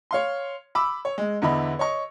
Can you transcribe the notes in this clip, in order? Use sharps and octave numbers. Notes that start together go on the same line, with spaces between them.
C#5 F5 C6
B5 D6 E6
C#5
G#3
E2 D3 E4 D#5 B5
C#5 D#5 C#6